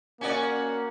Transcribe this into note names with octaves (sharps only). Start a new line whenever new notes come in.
A#3 C#4 F#4 D5